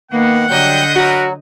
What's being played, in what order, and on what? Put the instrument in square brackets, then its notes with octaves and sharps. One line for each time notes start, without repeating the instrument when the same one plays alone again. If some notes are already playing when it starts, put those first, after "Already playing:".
[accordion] D#3 B3 [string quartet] A#3 [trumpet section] F#5
[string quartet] D3 D#5 G6 [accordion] F#3 G3 G5
[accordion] F#3 [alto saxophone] F#4 [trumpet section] A#4 B4 F#5